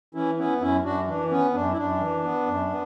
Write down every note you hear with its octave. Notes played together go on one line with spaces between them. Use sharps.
E3 C#4 E4
B3 C#4 E4
F#2 C#4 E4
F#2 D4 F#4
E3 D4
B3 C#4
F#2 D4
E4
F#2 D4
E3
B3
F#2
B3